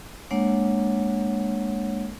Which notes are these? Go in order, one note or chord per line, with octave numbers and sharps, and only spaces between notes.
G#3 A#3 D4 C#5 F#5